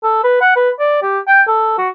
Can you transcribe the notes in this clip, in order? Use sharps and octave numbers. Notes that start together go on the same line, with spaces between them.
A4
B4
F#5
B4
D5
G4
G5
A4
F#4